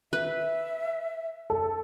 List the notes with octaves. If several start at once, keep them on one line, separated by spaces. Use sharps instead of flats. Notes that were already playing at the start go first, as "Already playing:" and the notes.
B4 E5
A4